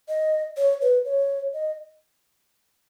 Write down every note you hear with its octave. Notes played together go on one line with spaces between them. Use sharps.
D#5
C#5
B4
C#5
D#5